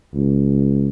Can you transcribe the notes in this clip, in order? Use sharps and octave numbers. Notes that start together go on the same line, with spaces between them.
C#2